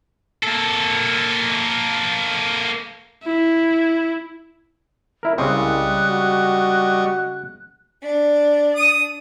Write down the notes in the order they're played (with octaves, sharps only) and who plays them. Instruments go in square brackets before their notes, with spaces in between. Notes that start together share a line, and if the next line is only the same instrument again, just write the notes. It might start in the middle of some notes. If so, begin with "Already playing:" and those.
[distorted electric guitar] A#3 A4
[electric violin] E4
[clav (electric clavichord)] E4 A#4
[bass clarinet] C2 [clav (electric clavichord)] C#3 G#3 C4 [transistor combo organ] G3 D#5 C#6 [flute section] F#6
[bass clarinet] F#4
[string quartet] D4
[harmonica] D#6